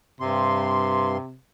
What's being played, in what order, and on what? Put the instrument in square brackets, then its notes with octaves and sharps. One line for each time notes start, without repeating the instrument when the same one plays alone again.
[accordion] G2 C6 [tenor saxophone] C3